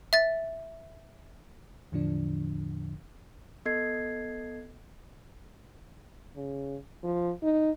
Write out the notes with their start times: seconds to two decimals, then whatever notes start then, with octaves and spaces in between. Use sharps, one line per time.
0.13 E5 A6
1.92 E2 A2 D3 F3 D4
3.65 B3 A4 D#5 G#6 C7
6.36 C#3
7.03 F3
7.43 D#4